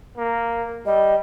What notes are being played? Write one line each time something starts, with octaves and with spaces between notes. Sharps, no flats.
A#3
G3 D#5